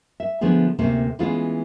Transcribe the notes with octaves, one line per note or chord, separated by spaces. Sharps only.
E5
D3 F3 A3 B3 G#4
D2 C3 A3 A#3 C#4
E3 G#3 A3 B3 C#4 F4